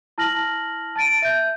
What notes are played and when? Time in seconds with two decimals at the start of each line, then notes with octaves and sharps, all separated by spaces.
0.18 E4 A5 F6 A#6 F#7
0.96 A5 A6 D7 D#7
1.22 E5 G6